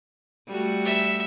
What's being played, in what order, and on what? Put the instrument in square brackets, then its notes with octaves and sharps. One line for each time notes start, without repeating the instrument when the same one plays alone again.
[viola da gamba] G3 A3 F#4
[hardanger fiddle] E5